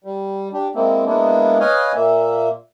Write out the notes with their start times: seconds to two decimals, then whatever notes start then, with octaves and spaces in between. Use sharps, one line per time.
0.04 G3
0.53 D4 G4
0.75 G#3 A#3 C4 E4
1.05 G#3 A#3 B3 D4 E4
1.60 B4 C#5 D#5 F5 G#5
1.95 A#2 A#3 E5